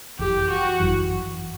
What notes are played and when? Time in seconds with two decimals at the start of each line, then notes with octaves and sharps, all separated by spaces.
0.19 G1 F#2 E3 G4
0.50 F#4
0.80 G1 F#2 E3